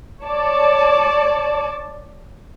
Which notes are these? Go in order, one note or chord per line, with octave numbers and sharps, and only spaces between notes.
C#5 D5 A5